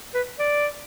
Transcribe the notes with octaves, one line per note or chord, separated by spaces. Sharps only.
B4
D5